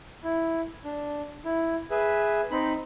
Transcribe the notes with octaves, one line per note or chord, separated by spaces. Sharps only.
E4
D4
E4
G#4 B4 E5
C4 D#4 B5